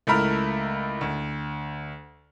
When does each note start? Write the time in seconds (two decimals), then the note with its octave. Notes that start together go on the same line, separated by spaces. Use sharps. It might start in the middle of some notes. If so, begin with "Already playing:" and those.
0.07 C#2 A3 E4 A#4 B5 F6
1.01 D2